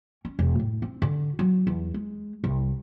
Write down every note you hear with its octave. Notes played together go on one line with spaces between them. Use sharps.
C#4
E1
A2
C4
D3
F#3
E2
G#3
C2